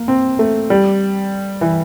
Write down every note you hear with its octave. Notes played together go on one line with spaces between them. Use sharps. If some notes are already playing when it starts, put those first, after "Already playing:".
Already playing: A#3
C4
A3
G3
E3